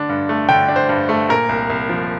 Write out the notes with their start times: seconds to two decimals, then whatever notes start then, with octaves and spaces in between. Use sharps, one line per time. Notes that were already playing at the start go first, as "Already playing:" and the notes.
Already playing: D3 D4
0.09 G2
0.29 A3
0.49 D3 G5
0.68 D4
0.76 C5
0.89 G2
1.09 A3
1.29 A#2 A#4
1.49 C2
1.70 C2
1.89 F3